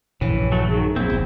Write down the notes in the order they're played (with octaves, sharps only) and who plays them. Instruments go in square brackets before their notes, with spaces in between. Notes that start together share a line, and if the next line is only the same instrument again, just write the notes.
[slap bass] A#1 G2 C#3 [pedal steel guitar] E3 [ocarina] C#5
[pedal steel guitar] F#3 A3
[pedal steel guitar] D#3 F#3 [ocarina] G#4
[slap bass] A#1 [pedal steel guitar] C4 E4
[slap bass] F1 B1